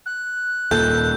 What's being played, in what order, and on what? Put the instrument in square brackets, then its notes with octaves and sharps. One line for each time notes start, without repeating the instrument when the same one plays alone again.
[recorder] F#6
[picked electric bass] D#2 A#2 [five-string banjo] A4 [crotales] G6